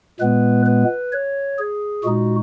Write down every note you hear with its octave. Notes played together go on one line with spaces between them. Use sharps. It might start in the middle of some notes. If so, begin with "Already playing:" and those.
A#2 G#3 B3 B4
B4
C#5
G#4
A#2 G#3 D#4 F#4